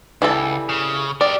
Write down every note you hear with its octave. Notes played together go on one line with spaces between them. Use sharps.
C#2 E3 G3 A4
C#3
G4 A#4 D5